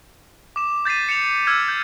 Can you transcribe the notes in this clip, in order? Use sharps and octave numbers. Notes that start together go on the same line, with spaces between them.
D6 E7
G6 A6 B6 C7 D#7
C#7 E7 F7
E6 F6 G#6 F7
G6